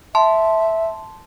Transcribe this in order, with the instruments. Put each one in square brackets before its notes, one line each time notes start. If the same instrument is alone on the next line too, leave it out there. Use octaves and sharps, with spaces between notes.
[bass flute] E5 [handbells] A5 C6